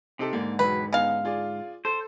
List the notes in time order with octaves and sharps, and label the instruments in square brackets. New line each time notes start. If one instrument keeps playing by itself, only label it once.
[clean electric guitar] C3 [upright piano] D#4 G4 A4
[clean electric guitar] G#2 D3 [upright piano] A#3
[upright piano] E1 F#3 [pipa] B4
[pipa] C#3 F5 [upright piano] B3 D#4
[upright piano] F4 G#4 D5
[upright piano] A4 [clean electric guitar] C5